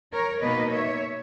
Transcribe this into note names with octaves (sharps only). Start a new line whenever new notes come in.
A#4 C#5
B2 A#3 D#4 B4 D#5
C#5 E5